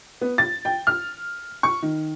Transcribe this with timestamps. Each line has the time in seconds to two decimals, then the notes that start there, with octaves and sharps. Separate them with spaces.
0.21 B3
0.38 A6
0.65 G5
0.87 F6
1.63 C#6
1.82 D#3